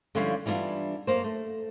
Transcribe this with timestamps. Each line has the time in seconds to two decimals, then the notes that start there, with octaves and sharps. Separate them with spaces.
0.15 D3 F3 G3 C#4 E4 F5
0.46 E3 G3 B3 D4 F4
1.07 F#2 A#3 C5
1.24 A3